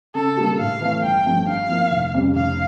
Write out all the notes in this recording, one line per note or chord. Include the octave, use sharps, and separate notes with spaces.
C#3 A4
G3 A#3 D4 G4
A2 F5
E3 A3
G1 G5
G2 F3 A3
G2 F5
F3 A#3 E4
F1
F2 C#3 G3 C#4
F1 F5